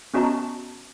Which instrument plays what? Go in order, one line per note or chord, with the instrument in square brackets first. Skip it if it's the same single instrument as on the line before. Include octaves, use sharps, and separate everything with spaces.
[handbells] B3 C#4 F#4 D#5 A5 A#5